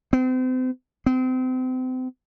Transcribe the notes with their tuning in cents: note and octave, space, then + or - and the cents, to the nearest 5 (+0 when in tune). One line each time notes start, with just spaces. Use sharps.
C4 -35
C4 -35